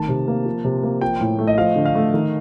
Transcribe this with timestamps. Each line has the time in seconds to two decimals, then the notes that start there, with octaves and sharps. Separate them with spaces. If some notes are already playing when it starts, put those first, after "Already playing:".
Already playing: D#3 A3 A5
0.09 C3
0.28 A#3
0.46 F3
0.65 C3
0.83 A#3
1.01 F3 G5
1.21 A2
1.39 A3
1.47 D#5
1.58 F3 F5
1.76 D3
1.86 F5
1.95 A3
2.14 D#3